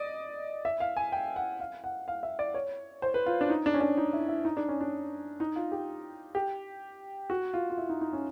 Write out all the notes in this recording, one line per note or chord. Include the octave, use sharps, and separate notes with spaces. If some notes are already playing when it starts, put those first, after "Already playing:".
Already playing: D5 D#5
E5
F5
G#5
G5
F#5
F5
F#5
F5
E5
D5
C#5
C5
B4
F4
D4
D#4
D4
C#4
D4
D#4
E4
E4
D#4
D4
C#4
D4
D#4
F4
G4
G4
F#4
F4
F4
E4
D#4
D#4
C#4